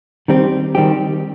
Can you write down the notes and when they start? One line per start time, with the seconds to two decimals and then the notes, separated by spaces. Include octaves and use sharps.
0.28 D#3 G3 C4 G4
0.75 D#3 G3 C4 G4